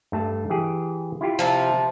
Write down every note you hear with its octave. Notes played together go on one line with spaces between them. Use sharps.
G2 A3 A5
E3 G4 G#4
E4 F4 G4
C3 F3